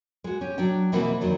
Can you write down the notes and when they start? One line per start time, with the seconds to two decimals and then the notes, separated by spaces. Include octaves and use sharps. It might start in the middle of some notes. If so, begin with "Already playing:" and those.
0.24 G#3 F#4
0.41 C#4 G4
0.58 F#3 D4 G5
0.92 B2 E3 A#3 C4 E4 F#4
1.21 F2 D#3 F#3 D4